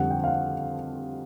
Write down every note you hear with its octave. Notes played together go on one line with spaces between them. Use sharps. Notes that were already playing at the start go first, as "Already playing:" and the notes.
Already playing: F2 D3 G3 F#5
G5
F5
F#5